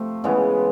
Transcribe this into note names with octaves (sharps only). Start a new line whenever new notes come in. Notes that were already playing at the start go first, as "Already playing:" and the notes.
Already playing: C3 F3 A3
C#3 E3 G#3 B3